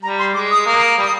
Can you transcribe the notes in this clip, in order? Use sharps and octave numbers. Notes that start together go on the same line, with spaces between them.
G3 A#5
C6
G#3 D6
D#6
A#3
D#6
G3
D#6